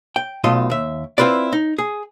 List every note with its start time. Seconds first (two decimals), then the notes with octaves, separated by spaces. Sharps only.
0.16 G5
0.44 B1 B2 A3 F4 D#5
0.70 D#2 E5
1.18 C4 E4 F4 B4 D5
1.53 D#4
1.78 G#4